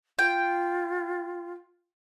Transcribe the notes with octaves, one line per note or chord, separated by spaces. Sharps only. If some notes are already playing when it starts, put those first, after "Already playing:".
F4 G5